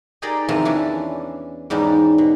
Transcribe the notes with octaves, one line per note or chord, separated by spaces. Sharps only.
D#4 G4 G#4 A#4 D5 D#5
E2 C3 D#3 F3
E3 C#4 D4
E2 G#2 G3 C#4 D#4
B2